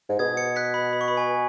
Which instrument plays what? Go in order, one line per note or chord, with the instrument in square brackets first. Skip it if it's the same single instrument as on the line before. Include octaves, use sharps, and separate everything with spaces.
[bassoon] G#2
[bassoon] B2 [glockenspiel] D#6 G#6
[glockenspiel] G#6 C#7
F#6 B6
B5
B5
C#6
B5
G#5